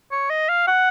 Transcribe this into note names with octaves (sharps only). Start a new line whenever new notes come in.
C#5
D#5
F5
F#5